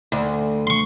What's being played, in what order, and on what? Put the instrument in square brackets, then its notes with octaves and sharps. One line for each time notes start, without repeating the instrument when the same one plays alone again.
[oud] D2
[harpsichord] C6 C#6